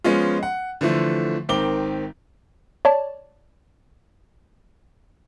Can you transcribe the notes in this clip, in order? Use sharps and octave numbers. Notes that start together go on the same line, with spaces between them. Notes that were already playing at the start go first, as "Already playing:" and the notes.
F3 G#3 B3 C#4 F4
F#5
D3 E3 F3 A3
G#1 D#3 C4 D6 G7
C#5 D5 A5